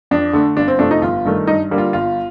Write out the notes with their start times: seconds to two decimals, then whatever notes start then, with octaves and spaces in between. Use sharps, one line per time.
0.11 F2 D4
0.33 D3 A3
0.56 G1 D4
0.68 C4
0.79 F2 C3 F3 A3 D4
0.91 D#4
1.02 G1 F4
1.25 G2 D#3 A3
1.47 G2 D#4
1.71 D3 G3 A#3
1.78 F4
1.93 G1 F4